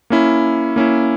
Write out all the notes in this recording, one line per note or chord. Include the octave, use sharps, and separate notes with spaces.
A#3 C#4 E4
A#3 C#4 E4